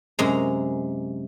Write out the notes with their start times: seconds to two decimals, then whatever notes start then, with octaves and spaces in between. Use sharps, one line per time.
0.19 F#2 C3 G#3 A#5